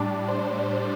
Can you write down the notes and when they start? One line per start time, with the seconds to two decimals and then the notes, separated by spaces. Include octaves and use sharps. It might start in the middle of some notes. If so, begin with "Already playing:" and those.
Already playing: A2 G3 D4 D5
0.28 C5